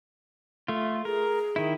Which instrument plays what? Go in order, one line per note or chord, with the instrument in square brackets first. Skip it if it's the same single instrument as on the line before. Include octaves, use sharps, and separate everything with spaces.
[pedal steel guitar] A3 F4
[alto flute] G#4 [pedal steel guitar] A#4
[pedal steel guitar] D#3 E4